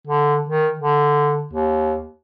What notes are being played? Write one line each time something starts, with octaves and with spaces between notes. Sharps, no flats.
D3
D#3
D3
D#2